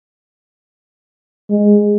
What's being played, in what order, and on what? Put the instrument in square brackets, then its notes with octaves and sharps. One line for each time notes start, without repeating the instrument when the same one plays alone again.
[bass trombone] G#3